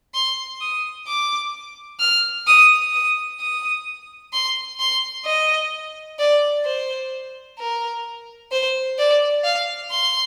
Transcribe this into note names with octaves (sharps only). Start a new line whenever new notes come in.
C6
D#6
D6
F6
D#6
D#6
D#6
C6
C6
D#5
D5
C5
A#4
C5
D5
F5
C6